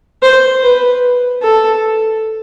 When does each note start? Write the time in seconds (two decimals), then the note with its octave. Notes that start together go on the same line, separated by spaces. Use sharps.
0.22 C5
0.63 B4
1.42 A4